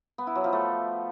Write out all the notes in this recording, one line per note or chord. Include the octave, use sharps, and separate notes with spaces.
B3
E4
F#3
F3
A3